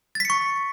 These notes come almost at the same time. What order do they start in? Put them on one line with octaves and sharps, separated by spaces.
A6 B6 C#7 C#6